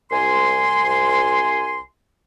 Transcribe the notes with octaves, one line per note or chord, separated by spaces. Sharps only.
C2 G#5 C6